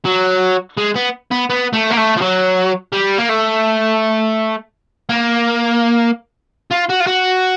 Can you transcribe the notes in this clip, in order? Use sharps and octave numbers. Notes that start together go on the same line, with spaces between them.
F#3
G#3
B3
B3
B3
A3
A#3
A3
F3
F#3
G3
A#3
A3
A#3
F4
F#4
F4
F#4